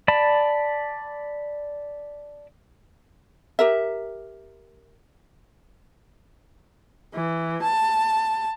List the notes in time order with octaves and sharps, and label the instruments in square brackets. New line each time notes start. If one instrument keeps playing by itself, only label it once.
[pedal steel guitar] D5 A5 B5
[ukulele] G4 A#4 E5
[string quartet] E3
A5